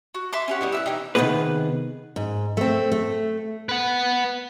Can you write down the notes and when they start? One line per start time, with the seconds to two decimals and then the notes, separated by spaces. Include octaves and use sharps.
0.14 F#4
0.33 E5 C6 D6
0.48 C#4 G4 F#5
0.61 G3 B3 E4
0.72 E5 E6 F#6
0.86 E3 C4 D#4 G5
1.15 C3 D#3 F3 B3 G#4 B4
2.16 G#2
2.57 A3 C4
2.92 A3
3.69 B4 F#5